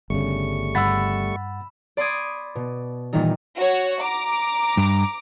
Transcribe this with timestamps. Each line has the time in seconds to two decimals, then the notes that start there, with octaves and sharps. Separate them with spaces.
0.10 G1 C#3 G3 A3 C#6
0.75 G2 F#5 B5 E6 A6
1.97 D5 B5 C6 D6 D#6 G#6
2.55 B2
3.13 A#2 D#3 E3 G3 D#4
3.57 F#4 C#5
4.02 A#5 D6
4.77 G2